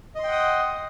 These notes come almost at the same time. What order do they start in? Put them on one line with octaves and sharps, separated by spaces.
D#5 C6 G5 F#5 D#6